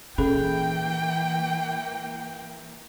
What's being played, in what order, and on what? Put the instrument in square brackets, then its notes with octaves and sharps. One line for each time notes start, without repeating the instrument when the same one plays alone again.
[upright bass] A#2 [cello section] E3 A#3 [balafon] C#4 G#4 A4 [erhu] G5